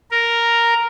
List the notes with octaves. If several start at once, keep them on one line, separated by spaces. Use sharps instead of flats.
A#4